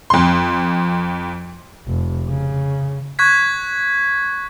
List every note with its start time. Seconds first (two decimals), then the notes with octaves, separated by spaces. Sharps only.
0.10 F2 C6
1.87 F1
2.28 C#3
3.19 C#6 F#6 G#6 B6